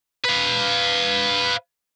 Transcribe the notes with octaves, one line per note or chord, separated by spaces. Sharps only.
B4 F5